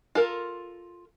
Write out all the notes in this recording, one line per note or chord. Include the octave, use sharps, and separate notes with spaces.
F4 A4 A#4